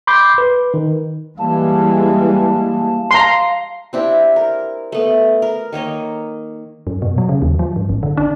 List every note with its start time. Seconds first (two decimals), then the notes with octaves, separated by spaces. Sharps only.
0.07 B5 C6 D6 G6 C7
0.38 B4
0.74 D#3
1.39 E3 G3 G#3 A#3 A5
3.11 F5 A#5 C6
3.93 C4 D4 E4 G4
4.36 A#4
4.92 A3 B3
5.42 A#4
5.73 D#3 A#3 C#5 D#5
6.87 F#2
7.02 B2
7.18 F#3
7.29 C#3
7.42 D#2
7.59 F3
7.76 G2
7.89 A1
8.03 D3
8.17 D4